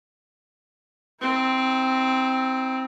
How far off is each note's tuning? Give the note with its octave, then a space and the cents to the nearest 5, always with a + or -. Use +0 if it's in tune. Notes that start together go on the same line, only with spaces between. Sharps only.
C4 +0 E4 -45